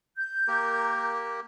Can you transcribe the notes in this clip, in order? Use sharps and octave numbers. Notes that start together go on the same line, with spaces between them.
G6
A#3 G4 A#4